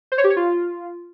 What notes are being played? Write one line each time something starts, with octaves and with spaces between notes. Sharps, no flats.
C5
C#5
G4
C#5
F4